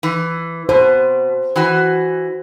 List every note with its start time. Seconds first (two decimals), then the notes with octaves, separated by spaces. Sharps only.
0.03 E3
0.69 B2 C5
1.56 E3 F#4